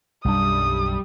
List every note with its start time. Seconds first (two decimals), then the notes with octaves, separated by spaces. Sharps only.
0.25 B1 F#2 G3 D4 D#6